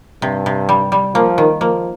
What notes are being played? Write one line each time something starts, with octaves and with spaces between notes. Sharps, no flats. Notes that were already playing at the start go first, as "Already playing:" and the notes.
G2 C3
C3
G3
G3
F3 A#3
D#3
F3 A#3